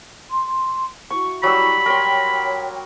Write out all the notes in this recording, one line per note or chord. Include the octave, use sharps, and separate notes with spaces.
C6
E4 F#4 C#6
F#3 G3 B5 E6
A#4 C#5 G5 C6